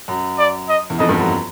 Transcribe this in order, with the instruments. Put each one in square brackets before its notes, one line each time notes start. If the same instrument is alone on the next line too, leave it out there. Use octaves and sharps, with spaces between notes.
[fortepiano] F#2
[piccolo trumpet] D5
D#5
[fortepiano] E2
[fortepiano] F2 [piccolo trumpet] D#5
[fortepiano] G2
F#2